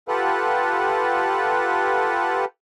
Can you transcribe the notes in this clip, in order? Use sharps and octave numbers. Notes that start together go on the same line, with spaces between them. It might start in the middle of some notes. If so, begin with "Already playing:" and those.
F4 G4 A4 B4 F#5